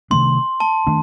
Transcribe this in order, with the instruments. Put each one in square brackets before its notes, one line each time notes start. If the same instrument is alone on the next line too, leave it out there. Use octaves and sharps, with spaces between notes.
[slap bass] C3 D#3 A3 D4 [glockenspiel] C6
[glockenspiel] A5
[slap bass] D#3 A3 D4